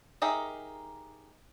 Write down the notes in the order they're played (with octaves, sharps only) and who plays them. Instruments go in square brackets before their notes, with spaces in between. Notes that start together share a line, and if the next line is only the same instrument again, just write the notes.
[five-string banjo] D#4 G4 G#4 A#4 E5